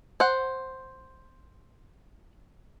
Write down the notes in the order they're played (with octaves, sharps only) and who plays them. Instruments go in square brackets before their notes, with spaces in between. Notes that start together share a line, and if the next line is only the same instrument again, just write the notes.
[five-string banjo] C5 F#5